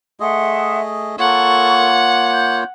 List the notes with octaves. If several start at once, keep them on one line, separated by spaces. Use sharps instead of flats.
A3 G#4 D#5 E5 F#5 C6
A#3 F4 A4 A#4 C#5 F#5 C#6
G6